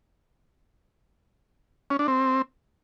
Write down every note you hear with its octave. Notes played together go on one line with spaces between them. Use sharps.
C#4
D4
C4